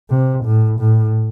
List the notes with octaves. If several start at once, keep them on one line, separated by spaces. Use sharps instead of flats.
C3
A2
A2